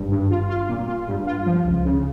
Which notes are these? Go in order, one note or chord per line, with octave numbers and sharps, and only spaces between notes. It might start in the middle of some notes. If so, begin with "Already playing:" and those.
Already playing: G#1 G2
G2
F4
F4
A#2
F4
G2
F4
F3
C#2
C#3